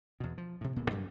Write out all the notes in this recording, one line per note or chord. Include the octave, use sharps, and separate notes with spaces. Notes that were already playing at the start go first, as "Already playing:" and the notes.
E2 B2
F3
A2 C3
D1 A#2 B3
F#2 F#3 G3